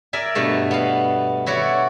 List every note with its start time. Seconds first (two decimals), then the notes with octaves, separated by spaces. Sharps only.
0.13 A#4 D5 E5 G#5
0.35 G2 B2 A3 F5
0.71 B3 F5
1.46 E4 F#4 C#5 D5